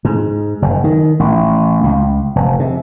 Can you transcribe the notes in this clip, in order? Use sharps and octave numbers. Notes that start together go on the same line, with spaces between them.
G#2
F#1
D#3
A1
C#2
F1
C3